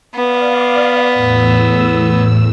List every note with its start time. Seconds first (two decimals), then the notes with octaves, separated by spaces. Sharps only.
0.15 B3 D5 F5
1.14 E2 A2 E6